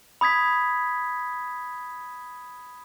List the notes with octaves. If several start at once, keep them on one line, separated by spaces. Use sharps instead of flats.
B5 D#6 G#6 B6